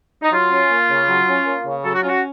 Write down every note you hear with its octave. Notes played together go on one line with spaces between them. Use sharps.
D#4
F#3 F4
C#4
A#3
C#3
F#3
C#4
A#3
C#3
F#3 A4
F#4
C#4 F4
F#4